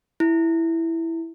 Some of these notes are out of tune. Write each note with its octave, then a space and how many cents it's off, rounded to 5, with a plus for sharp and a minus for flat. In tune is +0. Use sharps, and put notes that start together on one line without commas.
E4 +0